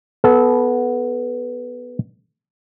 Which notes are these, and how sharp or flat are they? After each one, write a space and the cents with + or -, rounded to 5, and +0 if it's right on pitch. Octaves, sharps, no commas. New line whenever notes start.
B3 +0 A4 -25